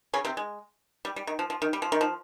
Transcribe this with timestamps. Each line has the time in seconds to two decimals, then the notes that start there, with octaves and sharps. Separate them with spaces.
0.13 C#3 C#4
0.25 C3 C4
0.37 G#3
1.05 G3
1.16 G3
1.27 D#3
1.39 F3
1.50 F3
1.62 D#3
1.73 G3
1.82 F3
1.92 D#3
2.01 F3